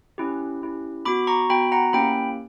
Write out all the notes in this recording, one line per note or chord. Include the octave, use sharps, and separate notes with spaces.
C#4 E4 G4
C#4 E4 G4
B3 F#4 B5 D6
A#5 C#6
B3 F#4 G5 B5
F#5 A#5
A#3 C#4 E4 G4 G5 B5